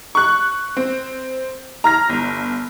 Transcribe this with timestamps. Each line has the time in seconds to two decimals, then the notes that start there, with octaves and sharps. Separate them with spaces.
0.15 C#6 F#6
0.77 C4
1.84 A#5 F6 A#6
2.09 G1